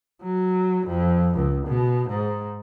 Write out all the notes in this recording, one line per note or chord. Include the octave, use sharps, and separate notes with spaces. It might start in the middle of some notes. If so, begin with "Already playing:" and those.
F#3
F2
C#2
B2
G#2